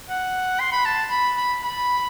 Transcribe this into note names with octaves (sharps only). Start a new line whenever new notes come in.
F#5
C6
B5
A5
B5
B5
B5